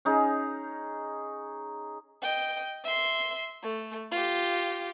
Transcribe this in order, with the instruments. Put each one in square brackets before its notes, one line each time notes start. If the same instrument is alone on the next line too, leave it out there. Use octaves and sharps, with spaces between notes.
[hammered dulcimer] C#4 D#4 G#4
[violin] D#5 G5
E5 C6
A3
F4 G4